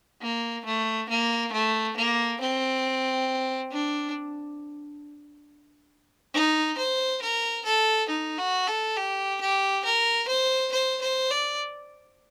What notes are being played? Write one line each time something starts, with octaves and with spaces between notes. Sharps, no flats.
A#3
A3
A#3
A3
A#3
C4
D4
D#4
C5
A#4
A4
D#4
F#4
A4
G4
G4
A#4
C5
C5
C5
D5